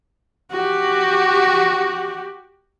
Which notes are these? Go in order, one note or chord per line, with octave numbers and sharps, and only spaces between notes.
F#4 G4